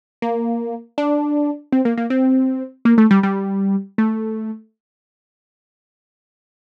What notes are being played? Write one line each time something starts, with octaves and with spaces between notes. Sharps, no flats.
A#3
D4
C4
A#3
A#3
C4
A#3
A3
G3
G3
A3